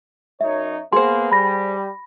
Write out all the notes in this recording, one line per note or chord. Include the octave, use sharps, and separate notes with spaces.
F#2 D#4 C#5 E5
A#3 B3 G#4 C5 C6
G3 B5 A#6